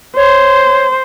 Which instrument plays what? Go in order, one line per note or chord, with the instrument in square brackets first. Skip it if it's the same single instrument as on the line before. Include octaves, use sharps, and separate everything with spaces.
[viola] C5 [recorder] C#5